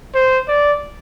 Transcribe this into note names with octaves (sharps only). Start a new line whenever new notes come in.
C5
D5